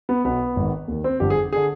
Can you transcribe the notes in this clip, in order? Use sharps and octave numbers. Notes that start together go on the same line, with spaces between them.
B3
B1 B2 B3
G#1 G#2 D#3
D#2 D#3
C4
G1 F2 D3 G4
G#4
D3 G#4